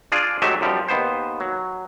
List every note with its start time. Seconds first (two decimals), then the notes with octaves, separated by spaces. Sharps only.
0.12 D4 F4 G#4 D5
0.42 G#2 F#3 A3 G4 D#5 E5
0.61 F#2 F3 G3 G4
0.88 D#2 B3 C5
1.40 F#3